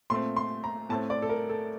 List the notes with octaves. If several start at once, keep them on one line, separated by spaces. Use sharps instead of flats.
A#2 A3 C4 C6
C6
A#5
A2 A3 C4 A5
D5
A4
A#4
A4